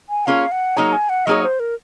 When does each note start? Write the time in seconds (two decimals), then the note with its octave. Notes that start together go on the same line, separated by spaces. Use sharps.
0.09 G#5
0.26 A#3 C#4 F4 G#4 C#5 F5
0.52 F#5
0.76 F#3 A#3 D#4 G#4 C#5 A#5
0.93 G#5
1.09 F#5
1.26 F#3 A#3 D#4 G#4 C#5 D#5
1.43 C5
1.60 A#4